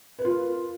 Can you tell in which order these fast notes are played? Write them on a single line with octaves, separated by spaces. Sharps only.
B4 A#4 F4